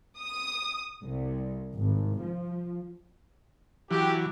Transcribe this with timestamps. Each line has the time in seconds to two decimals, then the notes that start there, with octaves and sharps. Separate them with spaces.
0.19 D#6
1.03 C2
1.74 G#1
2.21 F3
3.91 E3 F#3 G4